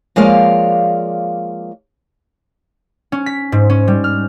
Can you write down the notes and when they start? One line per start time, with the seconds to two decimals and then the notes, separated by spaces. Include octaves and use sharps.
0.16 F3 G#3 A#3 C#5 D5 F5
3.12 C#4
3.26 B6
3.52 G#2
3.70 C#4
3.88 G3
4.04 F6